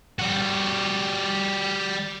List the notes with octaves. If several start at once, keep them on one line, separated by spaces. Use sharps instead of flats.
G3 F#4